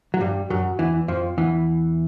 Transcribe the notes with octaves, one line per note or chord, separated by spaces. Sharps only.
F#3
G2 G3
F#2 F#3
E2 E3
F2 F3
E2 E3